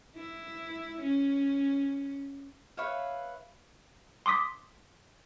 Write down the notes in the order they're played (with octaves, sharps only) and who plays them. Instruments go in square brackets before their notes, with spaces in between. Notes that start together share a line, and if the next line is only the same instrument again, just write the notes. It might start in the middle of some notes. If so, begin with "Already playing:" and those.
[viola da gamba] E4
C#4
[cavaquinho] B4 C#5 E5 F5
[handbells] C6 D6 D#6 B6